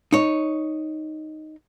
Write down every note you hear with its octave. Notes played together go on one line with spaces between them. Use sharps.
D#4 C#5